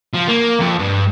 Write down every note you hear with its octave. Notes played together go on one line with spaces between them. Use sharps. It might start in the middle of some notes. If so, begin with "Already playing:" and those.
F3
A#3
F2
G2